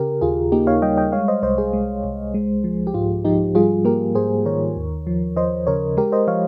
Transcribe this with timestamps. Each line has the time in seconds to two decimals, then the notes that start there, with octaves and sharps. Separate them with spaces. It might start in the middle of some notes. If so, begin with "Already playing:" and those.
Already playing: C#3 G4 A#4
0.21 D#2 F4 G#4
0.52 A#3 D#4 G4
0.67 C#5 F5
0.82 G3 D#5 G5
0.97 D#5 G5
1.12 G#3 C#5 F5
1.28 C5 D#5
1.43 C2 C5 D#5
1.58 G#4 C5
1.73 G#3
2.04 C2
2.34 G#3
2.64 F3
2.87 G4
2.94 G#2 F4
3.25 F3 D#4 G4
3.55 G3 F4 G#4
3.85 A#3 G4 A#4
4.15 G#2 G#4 C5
4.46 D#3 A#4 C#5
4.76 D#2
5.07 F3
5.37 F3 C5 D#5
5.67 C#3 A#4 C#5
5.97 G#3 G4 A#4
6.12 C5 D#5
6.27 F3 C#5 F5